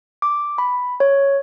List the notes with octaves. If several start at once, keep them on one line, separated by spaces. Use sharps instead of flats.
D6
B5
C#5